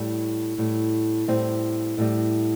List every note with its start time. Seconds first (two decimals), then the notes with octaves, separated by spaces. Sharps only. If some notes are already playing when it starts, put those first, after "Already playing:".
Already playing: A2 G3
0.58 A2 G3
1.28 A2 G3 C4
1.98 A2 G3